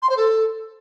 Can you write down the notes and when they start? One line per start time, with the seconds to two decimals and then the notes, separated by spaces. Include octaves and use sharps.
0.02 C6
0.09 C5
0.17 A4